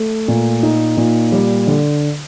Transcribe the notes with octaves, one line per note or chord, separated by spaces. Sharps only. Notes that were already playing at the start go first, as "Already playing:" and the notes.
Already playing: A3
A#2
D#4
A#2
G3
D3